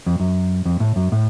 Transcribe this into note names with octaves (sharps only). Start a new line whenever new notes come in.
F2
F#2
F2
A2
F#2
A2